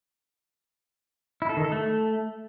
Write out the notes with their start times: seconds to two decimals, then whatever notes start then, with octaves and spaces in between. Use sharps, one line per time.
1.42 E4
1.49 A4
1.57 D#3
1.64 A4
1.72 A3